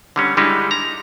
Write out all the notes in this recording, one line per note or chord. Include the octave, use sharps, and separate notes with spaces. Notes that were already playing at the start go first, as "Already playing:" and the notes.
D3 G3 C#4
D3 G3 G#3 D#4 E4
A#5